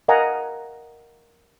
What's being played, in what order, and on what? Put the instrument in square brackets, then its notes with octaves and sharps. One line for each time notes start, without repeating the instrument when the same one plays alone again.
[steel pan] A#4 D#5 F5 F#5 G#5 A#5